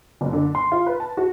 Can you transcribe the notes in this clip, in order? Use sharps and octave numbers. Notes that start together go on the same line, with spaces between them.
F#1
D3
C6
F4
B4
A5
F#4